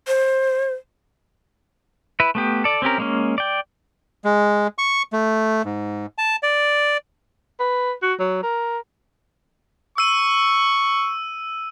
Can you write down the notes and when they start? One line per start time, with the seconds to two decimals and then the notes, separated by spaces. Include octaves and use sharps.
0.07 C5
2.20 E4 B4
2.35 A3 B3 G4
2.64 A4 D5
2.82 C4 C#4 G4 A#4
2.98 G#3 A#3 C#4
3.38 D5 G5
4.24 G#3
4.78 C#6
5.13 A3
5.65 G#2
6.18 A5
6.43 D5
7.60 B4
8.02 F#4
8.20 F#3
8.43 A#4
9.98 C#6 E6 D#7